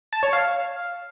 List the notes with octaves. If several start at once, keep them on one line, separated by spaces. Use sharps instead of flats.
A5
C#5
F5